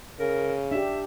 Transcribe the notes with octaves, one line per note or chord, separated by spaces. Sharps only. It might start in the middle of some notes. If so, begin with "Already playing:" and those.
C#3 A#4
D4 G4 E5